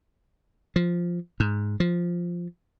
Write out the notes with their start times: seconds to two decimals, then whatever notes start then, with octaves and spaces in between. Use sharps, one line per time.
0.76 F3
1.40 G#2
1.80 F3